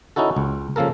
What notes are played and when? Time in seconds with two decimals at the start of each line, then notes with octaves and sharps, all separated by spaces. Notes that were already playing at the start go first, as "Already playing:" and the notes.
0.16 C#4 D#4 E4 F#4 A4
0.36 C#2
0.76 C#3 F3 A#3 A4 A#4